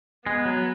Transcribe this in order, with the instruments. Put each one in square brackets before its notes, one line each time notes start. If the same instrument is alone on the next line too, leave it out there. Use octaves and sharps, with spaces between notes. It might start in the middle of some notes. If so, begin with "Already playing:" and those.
[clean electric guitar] G#3 [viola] B3
[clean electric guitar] F#3